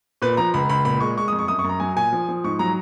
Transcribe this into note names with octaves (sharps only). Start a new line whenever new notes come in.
A#2 B4
F3 A#5
C#2 B5
C#2 B5
A#2 B5
G#3 C#6
G#3 C#6
D#6
F2
C#6
F#2 D#6
C#6
F#2
A#5
F#3 G#5
A#2 G#5
F3
F3
G#2 C#6
F#3 A#5